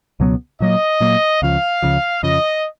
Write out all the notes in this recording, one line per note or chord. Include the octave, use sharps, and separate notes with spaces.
C#2 B2 F#3 B3
A#2 F#3 A#3 D#5
A#2 F#3 A#3
C#2 C#3 F3 F5
C#2 C#3 F3
F2 C#3 F3 D#5